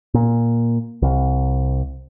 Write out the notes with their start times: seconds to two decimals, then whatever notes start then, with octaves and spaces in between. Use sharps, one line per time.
0.14 A#2
1.02 C2